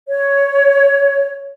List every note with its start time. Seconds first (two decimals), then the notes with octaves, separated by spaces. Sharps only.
0.08 C#5